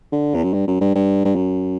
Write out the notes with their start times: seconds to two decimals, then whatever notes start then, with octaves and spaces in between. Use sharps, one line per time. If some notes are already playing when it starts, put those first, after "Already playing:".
0.12 D3
0.35 E2
0.43 F#2
0.53 G2
0.67 F#2
0.81 G2
0.95 G2
1.25 G2
1.36 F#2